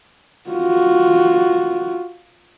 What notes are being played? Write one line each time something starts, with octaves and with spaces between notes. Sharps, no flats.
F4 F#4